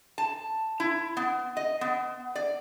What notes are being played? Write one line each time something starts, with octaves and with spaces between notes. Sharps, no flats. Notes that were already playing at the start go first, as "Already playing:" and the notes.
A5
E4
B3
D#5
B3
D5